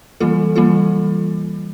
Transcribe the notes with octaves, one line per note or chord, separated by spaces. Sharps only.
E3 G3 A#3 F4 A4
E3 G3 A#3 F4 A4